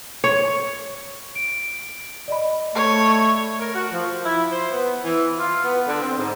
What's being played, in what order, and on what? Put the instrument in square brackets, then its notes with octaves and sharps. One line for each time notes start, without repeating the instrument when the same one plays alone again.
[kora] C#5
[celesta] D7
D5 D#5 B5
[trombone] A3 [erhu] C#5
[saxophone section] A#4
F#4
F3
E4
C5
B3
E3
F4
B3
D3
C4
G#2